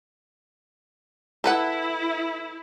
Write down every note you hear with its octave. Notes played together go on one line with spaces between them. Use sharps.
E4 A4 B4 F#5